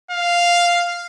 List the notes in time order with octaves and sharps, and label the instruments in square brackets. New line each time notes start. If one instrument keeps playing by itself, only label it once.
[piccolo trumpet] F5